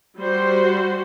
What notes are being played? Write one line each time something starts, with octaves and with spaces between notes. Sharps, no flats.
G3 F#4 C5